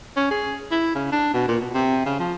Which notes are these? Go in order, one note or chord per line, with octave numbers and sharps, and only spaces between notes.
C#4
G#4
E4
C#3
D4
B2
A#2
B2
C3
C#3
F3